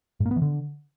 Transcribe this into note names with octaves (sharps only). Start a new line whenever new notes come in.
G#2
A#3
B3
E3
D3